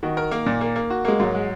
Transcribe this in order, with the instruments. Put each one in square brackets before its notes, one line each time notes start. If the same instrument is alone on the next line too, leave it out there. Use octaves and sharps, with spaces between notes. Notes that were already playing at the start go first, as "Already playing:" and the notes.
[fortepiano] D#3 [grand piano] F#4
[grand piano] A#4
A#3
A#2
A#3
A#3
F#4
[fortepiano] G#3 [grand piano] A#3
[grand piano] G#2 [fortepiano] F#3
[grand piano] G#3